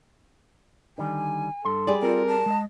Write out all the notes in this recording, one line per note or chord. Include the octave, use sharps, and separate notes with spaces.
D3 D#3 G3 G#5
G2 A4 C6
G3 G#4 D5
C4 F4 A4 A#4
A5
G#3 D#5